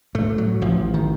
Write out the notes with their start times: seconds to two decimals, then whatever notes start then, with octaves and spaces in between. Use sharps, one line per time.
0.15 A2 A3
0.38 F#3
0.62 A1 F3
0.94 D#3